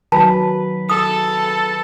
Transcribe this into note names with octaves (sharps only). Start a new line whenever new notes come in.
D#3 F#3 B4 A5
A4 D#6